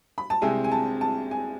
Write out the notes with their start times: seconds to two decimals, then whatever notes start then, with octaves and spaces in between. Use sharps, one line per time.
0.18 B5
0.30 A5
0.41 C2 C3 G#3 C4 G#5
0.64 G#5
0.72 A5
1.01 A5
1.31 G#5